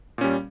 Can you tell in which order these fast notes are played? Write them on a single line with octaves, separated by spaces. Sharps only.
A#2 C#4 G3